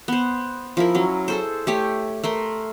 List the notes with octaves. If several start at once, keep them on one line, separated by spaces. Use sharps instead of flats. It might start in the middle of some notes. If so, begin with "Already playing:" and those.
B3 C5
F3 E4 A#4
F#3 C#4
G#4 A4 C5
A3 G4 C#5
A3 A#4 C6